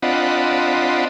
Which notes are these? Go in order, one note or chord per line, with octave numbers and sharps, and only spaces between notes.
C4 D4 F4 D#5 F#5 B5